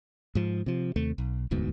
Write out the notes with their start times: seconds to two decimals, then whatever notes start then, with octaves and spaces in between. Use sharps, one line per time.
0.35 G#2 F3
0.66 C3 F3
0.96 D#2 C3 A3
1.18 B1
1.51 E1 D2 G#2 B2